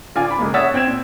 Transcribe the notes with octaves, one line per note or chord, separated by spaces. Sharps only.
D3 F4 D5 G#5
B5 D6
C#3 G#3 A#3
C#5 E5 F#5 D#6 E6 A6
C4 G5 G#6 E7
A#2